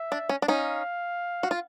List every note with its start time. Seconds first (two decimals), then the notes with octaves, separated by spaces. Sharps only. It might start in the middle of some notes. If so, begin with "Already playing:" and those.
Already playing: E5
0.12 D4
0.29 C#4
0.42 D4
0.48 C#4 D#4 F5
1.43 F#4
1.51 F4